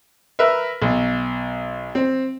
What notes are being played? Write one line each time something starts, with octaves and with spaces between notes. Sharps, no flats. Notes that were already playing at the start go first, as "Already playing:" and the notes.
A#4 B4 E5
B1
C4